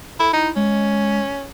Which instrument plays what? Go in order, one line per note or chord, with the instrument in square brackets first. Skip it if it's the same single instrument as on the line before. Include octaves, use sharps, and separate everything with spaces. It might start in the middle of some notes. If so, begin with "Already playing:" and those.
[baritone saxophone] E4 [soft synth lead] A4
[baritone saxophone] D#4 [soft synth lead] E4
[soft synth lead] G#3 [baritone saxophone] C#4